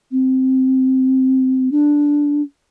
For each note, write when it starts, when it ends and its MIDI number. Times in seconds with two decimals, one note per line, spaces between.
0.12 1.69 60
1.72 2.42 62